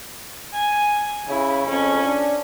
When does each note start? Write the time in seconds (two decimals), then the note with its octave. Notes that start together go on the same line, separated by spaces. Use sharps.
0.53 G#5
1.28 C#3 E4
1.67 F2 C#4
2.05 D4